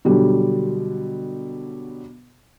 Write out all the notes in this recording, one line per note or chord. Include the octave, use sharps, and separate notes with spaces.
B2 D3 F#3 G3